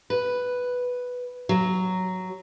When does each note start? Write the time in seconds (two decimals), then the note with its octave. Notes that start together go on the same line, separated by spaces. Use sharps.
0.10 B4
1.49 F#3